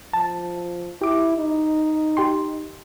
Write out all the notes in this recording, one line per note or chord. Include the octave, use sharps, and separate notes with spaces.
F3 A5
E4 G4 D6
D#4
G4 G5 C6